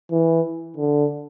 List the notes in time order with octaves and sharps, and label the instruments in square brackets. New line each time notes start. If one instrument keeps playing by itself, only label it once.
[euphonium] E3
D3